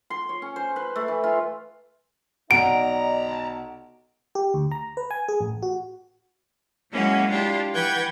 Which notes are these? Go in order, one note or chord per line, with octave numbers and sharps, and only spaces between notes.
C6
C#5
C#4
C5
B4
A3
E3
F4
B1 D#4 D5 D#5 F#5 A5 A#5 D7
G4
D2
A#5
B4
G#5
G#4
A1
F#4
F#3 G#3 A#3 C#4 E4 F#4
D4 E4 F4 G4
E3 B4 F#5 G5 G6 G#6